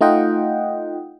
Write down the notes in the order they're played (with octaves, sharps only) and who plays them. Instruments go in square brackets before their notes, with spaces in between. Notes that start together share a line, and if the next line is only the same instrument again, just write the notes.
[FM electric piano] A3 D#4 F4 D#5 F#5 G5